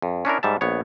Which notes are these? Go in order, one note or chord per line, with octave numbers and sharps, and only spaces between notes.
F2
C#4 D4 E4 A#4
G#2 G3 E5 A5
A#1 B3 C#5